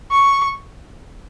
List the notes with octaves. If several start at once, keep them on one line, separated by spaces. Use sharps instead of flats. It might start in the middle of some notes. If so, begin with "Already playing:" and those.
C#6